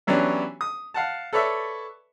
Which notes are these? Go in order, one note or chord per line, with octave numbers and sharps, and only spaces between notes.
E3 F#3 B3 C#4 D4 G4
D#6
F5 F#5 A5
A4 B4 C#5 D5 E5